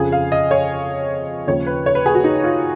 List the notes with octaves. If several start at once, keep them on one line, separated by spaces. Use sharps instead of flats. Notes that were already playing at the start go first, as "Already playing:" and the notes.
Already playing: F2 C#3 F3 G#4
F5
D#5
C#5
D#2 C#3 F3 C#5
B4
C#5
B4
G#4
F#4
D#4
F4